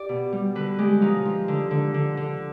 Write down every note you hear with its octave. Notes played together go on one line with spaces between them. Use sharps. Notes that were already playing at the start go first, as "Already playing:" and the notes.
Already playing: G4 D5
B2
G3
D3 B4
G#3 G4
F3 D#4
F3
D3
D3
D3
D3